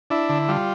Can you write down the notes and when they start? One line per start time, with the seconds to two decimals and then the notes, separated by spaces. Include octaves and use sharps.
0.10 D4 E4
0.29 D3
0.48 G3 F4